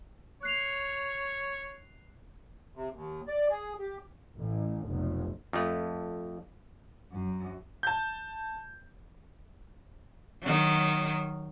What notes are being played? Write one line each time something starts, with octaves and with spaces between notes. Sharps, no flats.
C#5 F#6 C7 F7
C3
D#2
D5
G#4
G4
A1
F1 B1
F2 A3
F#2
A5 G6
D#3 F#3